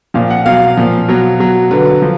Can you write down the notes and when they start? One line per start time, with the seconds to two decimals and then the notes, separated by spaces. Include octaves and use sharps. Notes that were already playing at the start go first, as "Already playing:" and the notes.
0.14 A#2 F3 F5
0.30 F#5
0.46 B2 F#3 F5
0.77 A#2 F3
1.08 B2 F#3
1.39 B2 F#3
1.71 D3 F#3 B4
2.02 F3